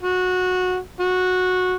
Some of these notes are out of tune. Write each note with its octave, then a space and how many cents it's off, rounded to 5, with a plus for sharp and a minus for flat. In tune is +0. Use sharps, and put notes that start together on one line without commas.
F#4 -15
F#4 -15